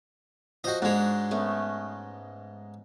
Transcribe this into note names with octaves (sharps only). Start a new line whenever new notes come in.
F3 F#4 C5 D#5
G#2 G#3 D4 F#4 C#5
A3 B3 C#4